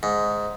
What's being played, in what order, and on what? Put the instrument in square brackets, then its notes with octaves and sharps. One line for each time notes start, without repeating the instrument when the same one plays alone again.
[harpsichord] G#2